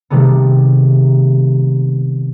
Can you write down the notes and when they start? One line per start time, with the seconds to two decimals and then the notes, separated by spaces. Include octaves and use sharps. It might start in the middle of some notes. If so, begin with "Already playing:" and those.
0.10 C3 D#3 G3 A3 B3